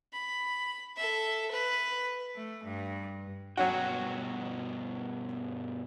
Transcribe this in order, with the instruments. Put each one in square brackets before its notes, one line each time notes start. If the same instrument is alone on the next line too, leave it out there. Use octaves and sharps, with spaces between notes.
[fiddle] B5
A4 E5
B4
[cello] A3
G2
[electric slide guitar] G2 B2 G5 [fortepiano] F#3 C#4 F#4